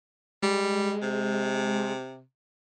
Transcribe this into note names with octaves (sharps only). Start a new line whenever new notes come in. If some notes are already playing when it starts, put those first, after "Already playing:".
G3 G#3
C3